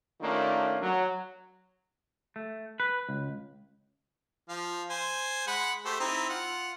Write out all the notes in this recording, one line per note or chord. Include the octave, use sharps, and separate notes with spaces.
D#3 A3 A#3 C#4 D4 F4
F#3
A3
B4
C#2
F3 F5
C5 G#5
G#3 F#5 B5
A3 G4 C5
C4 D#4 E4
F4 F#5